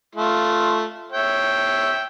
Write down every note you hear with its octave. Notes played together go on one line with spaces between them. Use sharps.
A3 F4
C#5 E5 G5